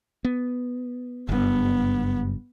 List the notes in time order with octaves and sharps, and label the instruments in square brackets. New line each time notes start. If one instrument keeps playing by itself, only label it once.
[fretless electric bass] B3
[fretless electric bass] F#1 G2 [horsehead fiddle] B3